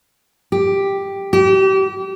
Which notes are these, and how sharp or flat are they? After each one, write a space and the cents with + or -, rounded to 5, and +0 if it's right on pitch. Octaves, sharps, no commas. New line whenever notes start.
G4 +5
G4 -35